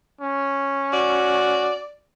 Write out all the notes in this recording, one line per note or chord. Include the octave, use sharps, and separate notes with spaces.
C#4
F#4 D5